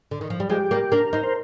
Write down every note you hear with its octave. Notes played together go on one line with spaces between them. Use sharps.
D3
D#3
F3
G3
F3 G#3 G4
G3 A#3
A#3 D4 A#4
C4 D#4
C5